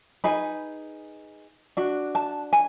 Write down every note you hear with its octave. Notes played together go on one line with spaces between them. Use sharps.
D#4 G#4 B4 B5
D4 F#4
A5
G#5